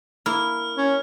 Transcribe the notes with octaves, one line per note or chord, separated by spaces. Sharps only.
A#3 E4 F6
C#4